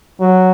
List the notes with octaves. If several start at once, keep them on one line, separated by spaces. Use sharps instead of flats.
F#3